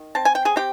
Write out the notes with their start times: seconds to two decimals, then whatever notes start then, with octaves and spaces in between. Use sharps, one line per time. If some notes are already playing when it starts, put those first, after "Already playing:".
Already playing: D#3
0.15 C4 A5
0.25 G#5
0.35 G5
0.45 G#4 G#5
0.56 C4 G4 G5